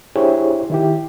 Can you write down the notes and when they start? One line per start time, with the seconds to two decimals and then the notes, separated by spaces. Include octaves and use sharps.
0.16 D4 E4 G4 G#4 C5 C#5
0.70 D#3 E4 G4